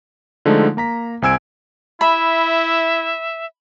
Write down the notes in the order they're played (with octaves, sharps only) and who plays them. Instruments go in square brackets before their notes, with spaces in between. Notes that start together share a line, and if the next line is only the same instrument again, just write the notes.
[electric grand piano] D3 F3 G#3 A3 D#4
A#3 A#5 B6
C2 C4 G#5 E6 G#6 D7
[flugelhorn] E4 [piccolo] E5 [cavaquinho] B5